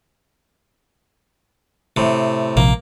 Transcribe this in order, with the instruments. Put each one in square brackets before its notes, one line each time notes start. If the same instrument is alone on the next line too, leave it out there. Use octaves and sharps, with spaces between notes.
[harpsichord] A2 C3
[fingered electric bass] A#1 C3 F3 [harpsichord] A#3